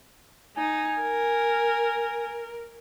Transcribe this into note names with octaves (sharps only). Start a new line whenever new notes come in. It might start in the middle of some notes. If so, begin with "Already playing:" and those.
D#4 G#5
A#4